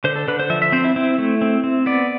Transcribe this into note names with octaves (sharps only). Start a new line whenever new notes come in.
D3 C5
A4
D3 B4
C5
F3 E5
E5
C4 C5
E4
C4 E4
A3
C4
C4
B3 D5